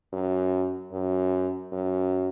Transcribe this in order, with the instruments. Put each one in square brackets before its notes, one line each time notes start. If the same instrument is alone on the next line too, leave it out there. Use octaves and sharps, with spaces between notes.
[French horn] F#2
F#2
F#2